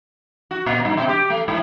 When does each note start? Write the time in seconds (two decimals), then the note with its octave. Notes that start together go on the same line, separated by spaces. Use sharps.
0.51 F#4
0.66 A#2
0.85 G2
0.97 B2
1.09 G4
1.30 A3
1.48 G#2